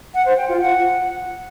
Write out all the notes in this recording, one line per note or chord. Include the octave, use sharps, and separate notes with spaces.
F#5
C5
G5
F4
F#5